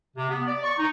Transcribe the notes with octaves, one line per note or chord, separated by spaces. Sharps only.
C3
B3
D5
C#6
D#4